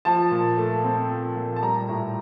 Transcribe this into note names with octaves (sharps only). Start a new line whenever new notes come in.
F3 A5
A#2
A3
C4
F3
A#2
A5
G3 A#5
A2